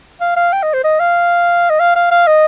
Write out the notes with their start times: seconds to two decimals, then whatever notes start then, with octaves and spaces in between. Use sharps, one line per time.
0.20 F5
0.36 F5
0.52 G5
0.62 D#5
0.73 C5
0.84 D#5
1.00 F5
1.70 D#5
1.80 F5
1.95 F5
2.11 F5
2.27 D#5